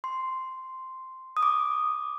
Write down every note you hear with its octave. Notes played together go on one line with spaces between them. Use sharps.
C6
D#6
D6